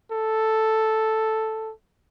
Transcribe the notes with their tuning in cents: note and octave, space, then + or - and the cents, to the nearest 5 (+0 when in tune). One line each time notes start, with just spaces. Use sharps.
A4 +0